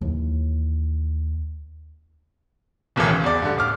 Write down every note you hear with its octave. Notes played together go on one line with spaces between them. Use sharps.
D#2 E3
D1 B1 D#3 E3
C#2
E2 D5
G2 D3
D1 D6 F6